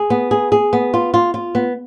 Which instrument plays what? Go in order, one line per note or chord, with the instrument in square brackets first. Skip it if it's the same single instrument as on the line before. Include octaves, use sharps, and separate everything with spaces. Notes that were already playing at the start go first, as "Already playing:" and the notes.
Already playing: [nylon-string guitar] G#4
B3
G#4
G#4
B3
F4
F4
F4
B3